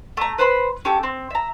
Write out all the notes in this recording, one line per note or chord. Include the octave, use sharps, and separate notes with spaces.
A3 A#5
B4 C5 B5 C6
C#4 G4 A4
C4
E5 A#5